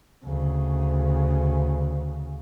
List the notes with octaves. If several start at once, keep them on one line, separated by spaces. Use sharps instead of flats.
D2 C#3